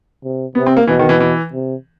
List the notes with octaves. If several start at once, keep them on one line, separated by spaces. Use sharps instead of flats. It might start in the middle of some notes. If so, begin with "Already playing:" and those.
C3
C3 B3
C4
A#3
B2 E3
D#3
E3
E3
C3